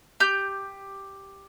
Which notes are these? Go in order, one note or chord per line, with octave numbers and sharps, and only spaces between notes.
G4 G6